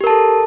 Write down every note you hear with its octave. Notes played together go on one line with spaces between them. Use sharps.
G4 A4 A#4 A5